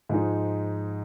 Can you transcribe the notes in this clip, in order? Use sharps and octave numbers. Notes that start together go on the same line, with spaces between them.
G#2 F3 G#3 D#4